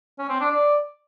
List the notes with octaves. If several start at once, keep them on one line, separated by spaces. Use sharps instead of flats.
C#4
C4
D4
D5